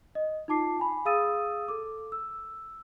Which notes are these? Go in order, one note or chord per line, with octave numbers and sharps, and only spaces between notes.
D#5
D#4 F4 A5 D6 C7
G#5 B5
G#4 F5 D#6 E6 A6 D#7
A4 D6
E6